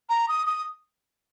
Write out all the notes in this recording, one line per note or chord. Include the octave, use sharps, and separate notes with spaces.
A#5
D#6
D#6